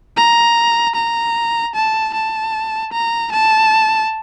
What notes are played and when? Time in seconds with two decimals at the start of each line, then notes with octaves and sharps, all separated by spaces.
0.17 A#5
0.95 A#5
1.75 A5
2.14 A5
2.92 A#5
3.32 A5